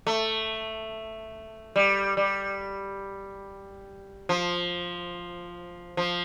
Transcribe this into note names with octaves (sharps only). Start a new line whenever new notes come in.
A3
G3
G3
F3
F3